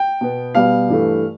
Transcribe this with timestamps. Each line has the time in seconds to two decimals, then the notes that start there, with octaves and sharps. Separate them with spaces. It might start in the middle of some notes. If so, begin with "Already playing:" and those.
Already playing: G5
0.21 B2 B3
0.55 B2 G3 B3 F5
0.89 G2 E3 A3